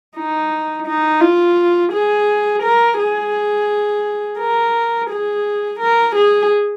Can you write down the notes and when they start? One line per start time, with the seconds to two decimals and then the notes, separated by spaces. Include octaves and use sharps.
0.17 D#4
0.87 D#4
1.21 F4
1.92 G#4
2.63 A#4
2.99 G#4
4.39 A#4
5.10 G#4
5.80 A#4
6.15 G#4